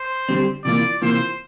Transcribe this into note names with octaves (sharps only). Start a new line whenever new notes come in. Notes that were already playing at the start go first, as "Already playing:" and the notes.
Already playing: C5
D3 G3 C4 G4
C3 E3 A#3 F4 D5
C3 E3 A#3 F4 C5